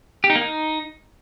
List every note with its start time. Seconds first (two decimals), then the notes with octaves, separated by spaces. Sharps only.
0.24 G4
0.30 D#4
0.36 A#3
0.41 D#4